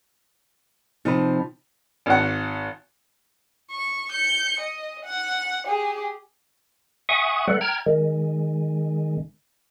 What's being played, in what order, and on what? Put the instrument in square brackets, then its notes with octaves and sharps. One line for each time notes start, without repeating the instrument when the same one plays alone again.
[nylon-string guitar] C3 F3 D#5 [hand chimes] D#4 B5
[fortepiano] G#1 F#5
[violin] C#6
G6 C#7
D#5
F#5
G4 G#4
[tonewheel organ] E5 F#5 G#5 C#6 D#6
G3 A3 A4 B4 F#5
G5 A#5 F6 G#6
D#3 G#3